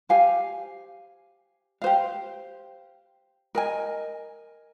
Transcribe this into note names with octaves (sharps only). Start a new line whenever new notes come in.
G4 C5 F5 G#5
G4 C5 F5
A#4 D#5 G#5